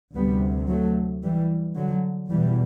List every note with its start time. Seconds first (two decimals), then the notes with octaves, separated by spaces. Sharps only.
0.15 D2 C3 G3 B3
0.69 F#3 A3
1.23 E3 G3
1.76 D3 F#3
2.30 E2 B2 E3 G3